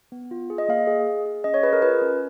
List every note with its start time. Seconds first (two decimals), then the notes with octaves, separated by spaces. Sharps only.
0.12 B3
0.31 F4
0.50 G#4
0.58 D#5
0.68 A#3 F5
0.87 G#4
1.07 G#4
1.26 G#4
1.44 C#4 D#5
1.54 C#5
1.63 G#4 B4
1.73 A#4
1.82 F4 B4
2.02 C#4